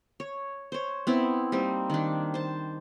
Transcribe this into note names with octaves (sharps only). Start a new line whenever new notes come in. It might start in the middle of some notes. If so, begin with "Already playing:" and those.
C#5
C5 C#5
B3 C4 E4
G3 A#3 C4 D#4
D#3 D4
C5 A5